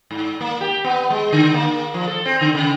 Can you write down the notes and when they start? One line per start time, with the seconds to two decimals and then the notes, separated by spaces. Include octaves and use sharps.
0.11 G#2
0.41 A#3
0.61 G4
0.84 B3
1.10 G#3
1.32 D3
1.54 A#3
1.94 F3
2.07 A4
2.26 C4
2.41 D3
2.55 C#3